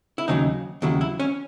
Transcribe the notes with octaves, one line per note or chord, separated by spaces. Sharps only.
E4
D#2 C#3 F#3 D#4
D#2 C#3 F#3 E4
E4
C#4